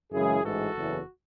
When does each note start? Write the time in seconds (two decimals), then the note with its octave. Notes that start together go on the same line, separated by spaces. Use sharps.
0.12 F#2 C#3 E3 G#3 E4 G#4
0.43 A1 G#2 E3 G#3 F#4 A4
0.75 F#1 E2 C#3 E3